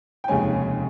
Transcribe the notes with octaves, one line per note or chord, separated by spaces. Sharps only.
G5
F1 D#2 C#3 G#3 C#4 G#5